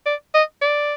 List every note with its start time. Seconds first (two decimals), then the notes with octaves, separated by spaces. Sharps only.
0.06 D5
0.34 D#5
0.62 D5